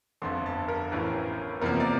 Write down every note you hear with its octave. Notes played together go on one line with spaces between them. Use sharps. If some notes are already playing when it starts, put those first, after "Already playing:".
G1 F2 D3 C6
A5
A#4
A1 A2 E3
E2 C3 F3 A#3 A#4
D5